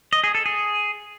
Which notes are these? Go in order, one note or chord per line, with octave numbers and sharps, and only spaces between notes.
D#5
G#4
A4
G#4